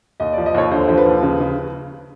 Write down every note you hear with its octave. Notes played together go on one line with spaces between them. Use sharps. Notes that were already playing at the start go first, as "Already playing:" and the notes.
D#2 D#5
F3 D5
D#5
D#2 C#5
D3 C5
F3 C5
B4
D#2
C#3
C#3